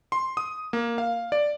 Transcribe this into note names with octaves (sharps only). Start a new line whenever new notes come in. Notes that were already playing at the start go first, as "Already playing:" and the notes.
C6
D#6
A#3
F5
D5